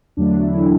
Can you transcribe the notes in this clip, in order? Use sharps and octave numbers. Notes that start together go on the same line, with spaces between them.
E2 D3 F#3 A3 D4
E4